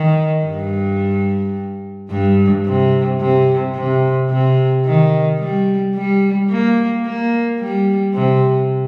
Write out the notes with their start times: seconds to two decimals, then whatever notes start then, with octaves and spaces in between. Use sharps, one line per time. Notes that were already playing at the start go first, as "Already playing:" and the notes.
Already playing: D#3
0.46 G2
2.10 G2
2.66 C3
3.20 C3
3.76 C3
4.30 C3
4.85 D#3
5.40 G3
5.95 G3
6.50 A#3
7.05 A#3
7.60 G3
8.15 C3